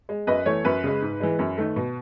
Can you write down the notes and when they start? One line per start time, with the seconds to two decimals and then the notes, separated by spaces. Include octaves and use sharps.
0.09 G#3
0.27 F#2 B4 D#5
0.46 E3 A3 C#5
0.65 F#2 B4
0.83 C#3 G#3
1.02 G#2
1.20 E3 G#3
1.39 F#2
1.58 D#3 A3
1.76 B2